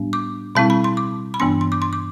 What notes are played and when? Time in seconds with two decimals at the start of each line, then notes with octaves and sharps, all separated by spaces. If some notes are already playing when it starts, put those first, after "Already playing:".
Already playing: A2 G3 B3 D4
0.13 D6
0.55 B2 G3 C4 E4 A5
0.70 B5
0.84 C6
0.97 D6
1.34 B5
1.40 G2 E3 B3 D4 C6
1.61 C6
1.72 D6
1.82 C6
1.93 D6